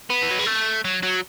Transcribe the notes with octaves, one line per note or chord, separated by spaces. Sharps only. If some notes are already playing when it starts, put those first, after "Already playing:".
B3
E3
F#3
G#3
A3
F#3
F#3